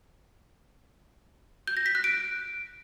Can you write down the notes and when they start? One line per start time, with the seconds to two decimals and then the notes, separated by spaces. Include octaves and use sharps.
1.67 G6
1.77 A#6
1.86 B6
1.95 F#6
2.04 D7